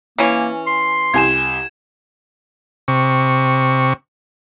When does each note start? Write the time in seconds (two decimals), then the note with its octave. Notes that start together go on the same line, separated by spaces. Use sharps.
0.18 E3 A#3 C#4
0.67 C6
1.14 C2 G4 G#5 G#6 E7
2.88 C3 C#6